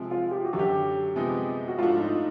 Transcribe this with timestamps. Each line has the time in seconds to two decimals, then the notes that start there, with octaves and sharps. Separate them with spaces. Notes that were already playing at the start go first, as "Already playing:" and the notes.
Already playing: C3 F3 G#3
0.11 F4
0.31 G4
0.45 F#4
0.53 F#2 D3 F#3
0.59 G4
1.16 C3 F3 G#3 B3 D#4
1.68 F#4
1.78 G#2 F3 A3 D4 F4
2.00 D#4